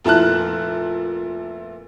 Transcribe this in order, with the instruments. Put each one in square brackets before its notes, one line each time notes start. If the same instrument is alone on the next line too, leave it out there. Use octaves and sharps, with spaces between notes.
[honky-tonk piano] F1 A#2 E4 A5 F#6